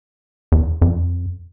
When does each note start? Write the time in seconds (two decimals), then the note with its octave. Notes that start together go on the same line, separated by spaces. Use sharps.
0.52 E2
0.82 F2